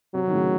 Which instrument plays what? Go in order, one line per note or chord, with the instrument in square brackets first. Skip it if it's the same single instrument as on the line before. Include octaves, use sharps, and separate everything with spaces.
[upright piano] C3 [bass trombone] F#3
[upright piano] D#3
A2 C#3